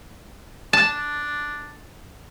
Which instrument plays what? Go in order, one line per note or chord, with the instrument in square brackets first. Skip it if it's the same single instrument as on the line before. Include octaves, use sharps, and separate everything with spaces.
[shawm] D4 [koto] A5